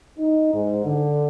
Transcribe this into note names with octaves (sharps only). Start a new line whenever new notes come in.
D#4
G#2
D3